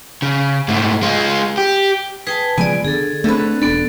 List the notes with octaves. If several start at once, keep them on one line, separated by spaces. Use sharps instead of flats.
C#3
G#2 A3
G#3 F4
G4
G#4 B4 G5 A5
C#3 F3 G#3 B3 D5 G#5
D3 G#4 A4
D3 A3 C4 B4
E1 B3 D4 A4